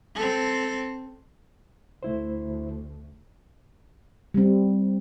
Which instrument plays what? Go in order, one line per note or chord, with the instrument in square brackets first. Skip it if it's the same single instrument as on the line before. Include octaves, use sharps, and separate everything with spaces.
[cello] C4 A4
[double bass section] D2 [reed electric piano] A3 E4 C5
[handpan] G3 C4